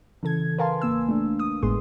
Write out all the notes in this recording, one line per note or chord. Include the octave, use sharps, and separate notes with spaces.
C#3 E3 A4 G#6
A#4 B4 F5 G#5 A5 C6
A1 A#3 E6
A3 D4
D#6
G#1 A2 G#3 B3 G#4 C6